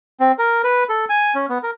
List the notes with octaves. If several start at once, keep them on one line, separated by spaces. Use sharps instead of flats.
C4
A#4
B4
A4
G#5
C#4
B3
A#4